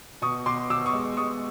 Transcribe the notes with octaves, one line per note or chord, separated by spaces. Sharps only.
B2 C#6 D#6
B2 C6 D6
B2 D6 E6
C#6 D#6
G#3
G#3 C#6 D#6